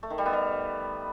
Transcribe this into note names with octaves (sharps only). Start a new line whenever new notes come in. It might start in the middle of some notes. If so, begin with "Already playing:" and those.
A3
D#3
G3
B3
G3